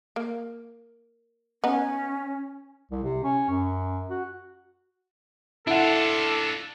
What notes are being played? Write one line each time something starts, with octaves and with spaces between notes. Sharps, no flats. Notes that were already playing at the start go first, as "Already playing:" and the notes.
A#3
B3 C#4 D#4
C2
C3
C#4
F#2
F#4
D4 E4 F4 A4 F#5